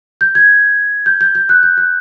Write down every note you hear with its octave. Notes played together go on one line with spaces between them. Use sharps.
G6
G#6
G6
G6
G6
F#6
G6
F#6